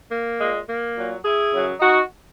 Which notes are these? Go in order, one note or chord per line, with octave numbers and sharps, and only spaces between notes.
A#3
A#2 G#3
A#3
A#2 F#3
E4 G#4
F#2 C#3 F#3
D#4 F#4